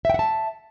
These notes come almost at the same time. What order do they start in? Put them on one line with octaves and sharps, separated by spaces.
E5 G5 F#5 A5